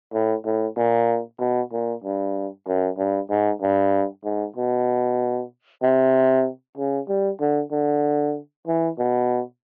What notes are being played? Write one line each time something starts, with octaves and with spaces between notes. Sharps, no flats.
A2
A2
A#2
B2
A#2
G2
F#2
G2
G#2
G2
G#2
B2
C3
C#3
G3
D3
D3
E3
B2